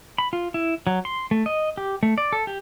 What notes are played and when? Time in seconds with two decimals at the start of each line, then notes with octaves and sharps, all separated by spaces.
0.18 B5
0.33 F4
0.54 E4
0.87 F#3
1.05 C6
1.31 A3
1.46 D#5
1.78 G4
2.03 A3
2.18 D5
2.33 A4
2.47 G4